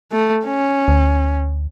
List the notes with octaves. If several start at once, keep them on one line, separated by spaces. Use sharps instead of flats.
A3
C#4
D2